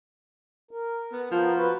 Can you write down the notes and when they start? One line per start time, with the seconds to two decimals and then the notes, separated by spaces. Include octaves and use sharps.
0.71 A#4
1.12 B3
1.31 F3 B3 A#4
1.54 F#4 B4